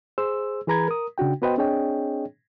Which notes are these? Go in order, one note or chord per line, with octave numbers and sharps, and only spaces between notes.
G#4 C5 E6
E3 G#4 B4 A#5 B5 G#6
A#4 D#6
C#3 D4 F#4 G5
B3 F#4 B4 C5 D#5 G5
C4 D4 G#4 C#5 D#5 G5